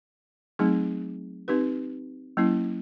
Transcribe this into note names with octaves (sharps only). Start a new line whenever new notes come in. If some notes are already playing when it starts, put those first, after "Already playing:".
F#3 A3 C4 D#4 G#4
C4 D#4 G4 B4
F#3 A#3 C#4 E4